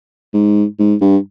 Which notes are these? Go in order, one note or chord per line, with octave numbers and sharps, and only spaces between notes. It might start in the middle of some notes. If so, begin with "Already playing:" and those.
G#2
G#2
G2